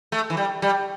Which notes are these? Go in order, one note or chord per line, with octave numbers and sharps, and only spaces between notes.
A3
E3
G3
G3